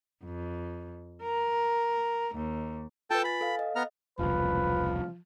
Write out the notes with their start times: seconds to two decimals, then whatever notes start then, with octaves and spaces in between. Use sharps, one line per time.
0.25 F2
1.23 A#4
2.36 D#2
3.11 F4 A4 B4 G5 A5
3.24 G#5 B5 A6
3.41 A4 F5
3.59 D#5
3.76 B3 A#5 F6
4.19 E1 C2 F3 B4